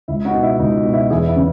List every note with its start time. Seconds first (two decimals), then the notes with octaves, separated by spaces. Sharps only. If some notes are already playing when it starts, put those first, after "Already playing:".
0.08 C#2 E4
0.25 D#4 F#4
0.34 B2
0.43 E4
0.59 C#2 D#4
0.85 B2
0.93 E4
1.10 E2 E4 G#4
1.27 E4
1.36 C#3